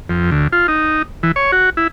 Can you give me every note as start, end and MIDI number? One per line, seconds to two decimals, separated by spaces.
0.09 0.31 41
0.31 0.47 38
0.52 0.67 65
0.68 1.02 63
1.23 1.32 52
1.36 1.51 73
1.52 1.70 66
1.77 1.87 64